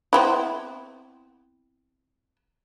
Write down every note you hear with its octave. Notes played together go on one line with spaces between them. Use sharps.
B3 C4 E4